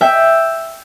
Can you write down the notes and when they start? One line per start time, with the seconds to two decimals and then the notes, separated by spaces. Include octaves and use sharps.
0.01 E5 G5